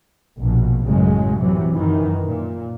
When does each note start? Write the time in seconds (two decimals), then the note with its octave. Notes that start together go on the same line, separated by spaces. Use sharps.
0.38 A#1 B2
0.84 A1 F#2 C#3 F#3 G#3
1.39 C3 E3 F#3
1.74 F#2 D#3 E3
2.26 A#2